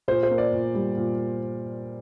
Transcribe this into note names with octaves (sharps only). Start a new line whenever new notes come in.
A#2 C5
C5
A#3
D5
A#2
G3
A#2